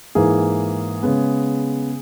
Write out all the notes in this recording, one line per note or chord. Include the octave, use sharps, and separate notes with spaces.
G#2 E3 A#3 G#4
C#3 G#3 B3